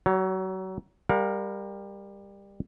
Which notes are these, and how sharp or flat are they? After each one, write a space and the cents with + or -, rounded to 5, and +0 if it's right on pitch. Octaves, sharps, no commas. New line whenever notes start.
F#3 +30 C#5 +0
G3 +20 A#4 +0 F5 +45